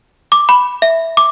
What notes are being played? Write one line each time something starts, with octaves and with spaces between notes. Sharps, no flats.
D6
B5
E5
D6